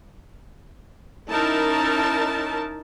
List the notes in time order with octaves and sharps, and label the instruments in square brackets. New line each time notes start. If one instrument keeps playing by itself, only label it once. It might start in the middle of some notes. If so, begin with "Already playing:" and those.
[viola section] C#4 D#4 E4 A#4 A5